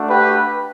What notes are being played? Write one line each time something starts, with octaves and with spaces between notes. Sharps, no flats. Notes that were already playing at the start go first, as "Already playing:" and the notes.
Already playing: A3 D4 F#4
G4 B4